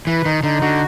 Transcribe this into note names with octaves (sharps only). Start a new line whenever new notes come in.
E3 B4
D#3 D#4
D3 D#4
D3 F#4